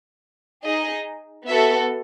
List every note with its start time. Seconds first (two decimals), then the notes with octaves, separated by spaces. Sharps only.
0.64 D#4 G#4 D#5
1.47 B3 F#4 A4 E5